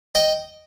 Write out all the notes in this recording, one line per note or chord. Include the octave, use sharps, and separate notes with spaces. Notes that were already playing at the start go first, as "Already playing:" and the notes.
D#5 G5